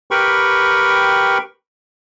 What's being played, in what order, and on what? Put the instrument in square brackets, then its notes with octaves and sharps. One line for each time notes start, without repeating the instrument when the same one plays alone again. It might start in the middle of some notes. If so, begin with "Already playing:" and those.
[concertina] G4 A#4 B4 G5 B5 C#6